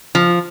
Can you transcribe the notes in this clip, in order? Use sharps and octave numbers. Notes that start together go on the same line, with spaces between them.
F3